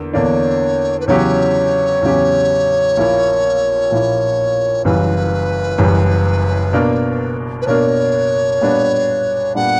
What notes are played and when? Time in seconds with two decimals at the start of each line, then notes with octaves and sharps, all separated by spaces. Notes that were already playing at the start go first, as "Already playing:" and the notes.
Already playing: E2 D3 A#3
0.13 E2 D3 A#3 D4 C#5
1.00 B4
1.07 E2 C#3 F#3 C#4 G4 C#5
2.02 E2 C#3 F#3 C#4 G4
2.97 A#1 A#2 A#3 E4
3.90 A#1 A#2 A#3 E4
4.84 F#1 F#2 E3 G3 B4
5.78 F#1 F#2 E3 G3
6.73 B2 A#3 D4 A#4
7.62 B4
7.67 B2 A#3 D4 A#4 C#5
8.61 A#2 G3 B3 D4
9.55 A#2 G3 B3 D4 F#5